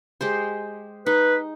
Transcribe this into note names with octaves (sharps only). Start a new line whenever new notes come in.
G#3 G4 C5
D#4 B4